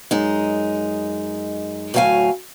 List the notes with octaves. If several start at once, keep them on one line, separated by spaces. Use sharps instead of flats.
F#2 G#3 D#4
D2 A2 F#3 G4 F5 G#5